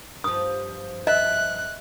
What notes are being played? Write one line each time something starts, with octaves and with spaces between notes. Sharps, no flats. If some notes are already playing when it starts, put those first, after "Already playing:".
G2 F3 D#6
D#5 E5 F#6